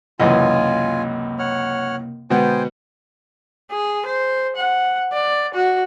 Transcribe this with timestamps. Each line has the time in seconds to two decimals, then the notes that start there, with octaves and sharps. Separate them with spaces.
0.20 C#2 F#2 C3 E3 A#3 F4 D#5 G#5
1.39 C#5 F#5 F6
2.30 B2 D3 G#3 B3 C5 G5 G#5
3.71 G#4
4.06 C5
4.56 F#5
5.13 D5
5.54 F#4